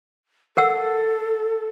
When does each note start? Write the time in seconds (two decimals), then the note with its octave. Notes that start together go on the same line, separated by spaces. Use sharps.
0.57 A4 A#4 F#5 E6